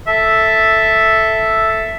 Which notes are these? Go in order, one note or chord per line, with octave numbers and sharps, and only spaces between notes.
A4 E5